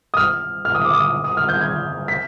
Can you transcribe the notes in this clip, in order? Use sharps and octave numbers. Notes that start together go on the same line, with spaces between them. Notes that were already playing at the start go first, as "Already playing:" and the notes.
D#6
F6
F6
D#6
D6
D#6
D#6
F6
G6
G#6
B6